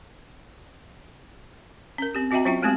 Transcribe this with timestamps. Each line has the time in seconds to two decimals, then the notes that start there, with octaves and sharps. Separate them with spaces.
1.98 C#4 A#4
2.15 C4 G4
2.31 C4 F#4 D#5 E5 G5 A#5
2.45 F#3 C#4 F4 E5 G5
2.62 G#3 A3 B3 C4 G4